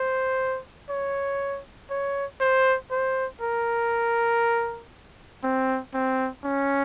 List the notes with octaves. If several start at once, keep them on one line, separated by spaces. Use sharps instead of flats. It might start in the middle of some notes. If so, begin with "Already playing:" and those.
Already playing: C5
C#5
C#5
C5
C5
A#4
C4
C4
C#4